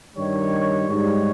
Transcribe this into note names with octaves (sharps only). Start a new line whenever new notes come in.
G2 D#3 G3 C#5
G#2 G3 C#5